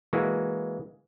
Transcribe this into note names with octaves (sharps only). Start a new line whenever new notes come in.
E3 G#3 A#3 F#4